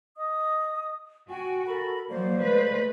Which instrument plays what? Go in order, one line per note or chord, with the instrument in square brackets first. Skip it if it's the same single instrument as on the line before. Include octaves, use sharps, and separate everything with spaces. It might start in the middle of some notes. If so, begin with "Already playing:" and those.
[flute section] D#5 D#6
[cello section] F#4 [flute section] G5 G#5
[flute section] A4 A#4 B5
[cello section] F3 F#3 A#3 [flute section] C5 D5 F5
[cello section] G#3 A3 B4